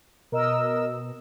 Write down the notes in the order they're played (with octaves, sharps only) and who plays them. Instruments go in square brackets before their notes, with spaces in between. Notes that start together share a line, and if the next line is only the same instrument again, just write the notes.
[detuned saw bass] B2 [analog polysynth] A#4 D#5 E6